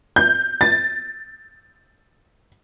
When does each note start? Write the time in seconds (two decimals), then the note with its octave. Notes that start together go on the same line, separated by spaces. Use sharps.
0.16 G6
0.61 A6